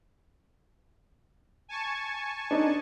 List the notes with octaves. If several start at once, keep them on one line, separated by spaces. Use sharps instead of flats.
G#5 A5 C#6
D4 D#4